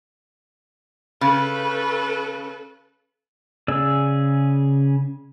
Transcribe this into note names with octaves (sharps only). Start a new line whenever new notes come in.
C#3 A4 B4
C#3 G#4 D5 E6